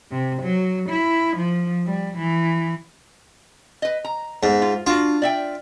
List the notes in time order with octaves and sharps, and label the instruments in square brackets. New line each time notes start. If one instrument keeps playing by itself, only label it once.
[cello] C3
F#3
E4
F3
G3
E3
[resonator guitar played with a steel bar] B4 D#5
A#5
[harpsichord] G#2 [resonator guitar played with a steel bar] B3
[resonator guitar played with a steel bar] F4
[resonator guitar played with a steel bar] D4 F#4 [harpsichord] F4
[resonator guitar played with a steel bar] D5 E5 G5